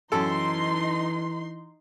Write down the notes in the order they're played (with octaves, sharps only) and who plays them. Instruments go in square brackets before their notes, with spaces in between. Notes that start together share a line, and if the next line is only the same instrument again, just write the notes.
[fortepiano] F#2 A4 [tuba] E3 [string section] D#4 C6